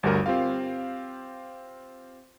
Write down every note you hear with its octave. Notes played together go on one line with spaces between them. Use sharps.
G1 D2 G3 F#4 A#4 C#6
C4 F4 G4 F5